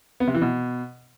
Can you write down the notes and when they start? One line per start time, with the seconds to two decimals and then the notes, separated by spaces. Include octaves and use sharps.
0.20 B3
0.27 C3
0.34 E3
0.41 B2